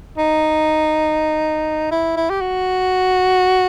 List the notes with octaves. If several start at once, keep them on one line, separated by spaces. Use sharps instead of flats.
D#4
E4
E4
G4
F#4